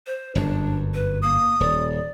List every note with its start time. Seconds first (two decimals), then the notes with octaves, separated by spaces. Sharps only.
0.07 C5
0.35 G1 F#2 D4
0.94 B4
1.22 A#3 D#6
1.60 D#1 D5